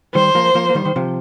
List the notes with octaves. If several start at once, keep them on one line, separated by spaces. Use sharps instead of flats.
D#3 G3 C5
F3 A#3
F3 A#3
A#3
D#3 G3
D#3
C3 F3